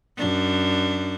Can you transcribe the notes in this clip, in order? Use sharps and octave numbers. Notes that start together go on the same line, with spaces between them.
F#2 D4